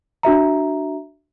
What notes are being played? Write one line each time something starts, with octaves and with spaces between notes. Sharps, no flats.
D4 F#4 E5 A#5